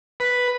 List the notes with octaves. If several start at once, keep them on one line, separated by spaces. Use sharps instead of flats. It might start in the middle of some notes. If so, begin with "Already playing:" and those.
B4